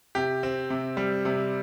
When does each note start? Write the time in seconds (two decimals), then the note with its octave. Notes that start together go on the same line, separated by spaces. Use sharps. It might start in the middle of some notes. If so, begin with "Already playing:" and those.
0.15 C3 G4
0.43 C4
0.70 C3
0.97 G3
1.25 C3